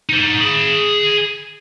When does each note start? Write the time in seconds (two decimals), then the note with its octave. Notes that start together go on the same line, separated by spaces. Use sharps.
0.09 D#4 C5
0.41 G#4 B5